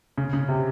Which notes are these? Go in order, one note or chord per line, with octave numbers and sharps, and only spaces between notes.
C#3
C#3
C3